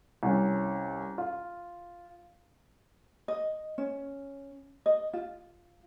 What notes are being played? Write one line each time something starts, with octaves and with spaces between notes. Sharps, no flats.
C2 C#4
F4
D#5
C#4
D#5
F4